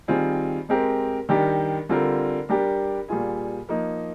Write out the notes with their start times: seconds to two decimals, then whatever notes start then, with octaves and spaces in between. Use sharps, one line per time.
0.08 D#3 G3 C4 F4 G#4
0.69 G#3 C4 G4 A#4
1.29 D#3 G3 D4 G4 A#4
1.89 D3 G3 C4 F4 A#4
2.49 G3 D4 G4 A#4
3.08 A#2 G3 A#3 F4 G#4
3.69 F3 A#3 D#4